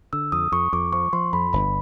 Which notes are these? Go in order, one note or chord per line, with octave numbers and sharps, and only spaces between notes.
D3 E6
F2 D#6
F2 C#6
F2 D6
F3 C#6
F3 C6
F2 B5
G1 B5